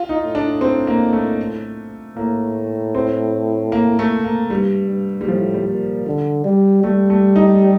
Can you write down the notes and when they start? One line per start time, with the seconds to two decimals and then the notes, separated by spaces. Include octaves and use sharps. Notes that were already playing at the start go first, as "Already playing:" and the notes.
Already playing: F4
0.09 D#4
0.23 A2
0.35 D4
0.61 C4
0.87 A#3
1.13 A3
2.17 A2 A#3
2.95 C4
3.72 A#3
3.99 A3
4.24 A#3
4.50 G2 G3
4.89 G2
5.21 G3
5.28 A2 F3
5.54 G3
5.67 A#2
6.06 D3
6.45 G3
6.84 G3 A3
7.10 A3
7.36 D#4